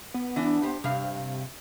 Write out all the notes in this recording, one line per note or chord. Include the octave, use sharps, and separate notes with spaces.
B3
E3 D4
G4 C5
G2 C3 F5